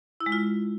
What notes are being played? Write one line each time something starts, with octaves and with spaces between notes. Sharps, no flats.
E4
G#3
F4